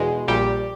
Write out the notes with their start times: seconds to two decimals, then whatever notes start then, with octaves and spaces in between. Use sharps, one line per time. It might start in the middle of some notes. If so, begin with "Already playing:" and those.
Already playing: E2 B2 G#3
0.28 A#1 A#2 G3 G4